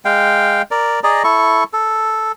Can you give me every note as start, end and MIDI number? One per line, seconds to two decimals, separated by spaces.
0.05 0.62 56
0.05 0.62 77
0.05 0.62 79
0.71 1.00 70
0.71 1.00 74
1.04 1.23 68
1.04 1.23 74
1.04 1.23 75
1.04 1.23 82
1.24 1.64 64
1.24 1.64 69
1.24 1.64 85
1.73 2.32 69